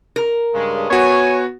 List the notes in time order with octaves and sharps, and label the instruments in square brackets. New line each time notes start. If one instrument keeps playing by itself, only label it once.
[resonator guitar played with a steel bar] A#4
[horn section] G2 C#3 G#3
[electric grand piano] B3 F#4 [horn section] C#5 G#5